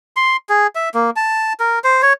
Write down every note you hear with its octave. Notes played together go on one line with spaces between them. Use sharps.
C6
G#4
E5
A#3
A5
A#4
C5
C#5